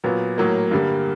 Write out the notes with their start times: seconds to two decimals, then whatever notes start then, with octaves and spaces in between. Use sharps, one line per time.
0.04 A#2 F#3 B3
0.38 A2 F#3 A#3
0.71 G2 D3 G3 A#3